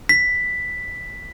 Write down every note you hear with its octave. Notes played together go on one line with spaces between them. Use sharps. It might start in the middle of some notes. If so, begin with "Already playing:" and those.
B6